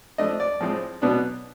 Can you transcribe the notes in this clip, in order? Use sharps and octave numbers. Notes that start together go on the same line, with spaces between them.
F3 A3 D4 D#5
D5
A2 F3 G#3 C4
B2 F#3 B3 D4